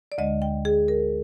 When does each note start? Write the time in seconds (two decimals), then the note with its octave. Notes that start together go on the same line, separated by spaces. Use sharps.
0.12 D5
0.18 D2 D3 G#3 D#5
0.42 G5
0.65 G#4
0.88 A#4